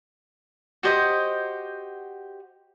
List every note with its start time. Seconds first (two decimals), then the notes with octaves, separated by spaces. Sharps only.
0.83 F#4 G4 C5 D#5